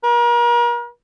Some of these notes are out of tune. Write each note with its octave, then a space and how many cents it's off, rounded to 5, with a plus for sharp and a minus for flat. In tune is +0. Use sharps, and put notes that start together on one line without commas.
A#4 +40